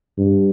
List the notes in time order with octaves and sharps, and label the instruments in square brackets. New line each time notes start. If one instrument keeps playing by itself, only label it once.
[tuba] G2